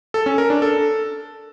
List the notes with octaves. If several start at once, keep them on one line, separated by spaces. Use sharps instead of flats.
A4
C#4
A#4
D4
A4